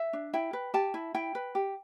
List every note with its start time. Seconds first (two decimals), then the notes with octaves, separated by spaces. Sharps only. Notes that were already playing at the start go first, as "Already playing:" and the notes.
Already playing: E5
0.13 D4
0.33 E4 G5
0.53 B4
0.74 G4 A5
0.94 E4
1.15 E4 G5
1.35 B4
1.55 G4